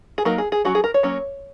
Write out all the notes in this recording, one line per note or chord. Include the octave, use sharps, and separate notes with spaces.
G#4
F#3 A#3 D#4 A#4
G#4
G#4
F#3 C#4 F#4
G#4
A#4
C#5
F#3 A#3 C#4